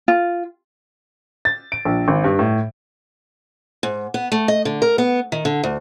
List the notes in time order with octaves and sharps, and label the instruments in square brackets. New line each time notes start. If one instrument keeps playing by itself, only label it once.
[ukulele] F4
[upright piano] A6
D7
A#1
G#1
G2
A2
[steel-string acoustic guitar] G#2
B3
A3
D#5
D3
A#4
B3
D#3
D3
D2